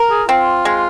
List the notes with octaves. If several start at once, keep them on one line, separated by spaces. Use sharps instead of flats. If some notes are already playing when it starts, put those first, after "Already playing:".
Already playing: A#4
G#4
C4 F4
G#3